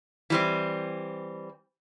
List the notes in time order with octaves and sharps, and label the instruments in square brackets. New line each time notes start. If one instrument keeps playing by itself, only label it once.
[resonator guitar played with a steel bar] E3 G3 C4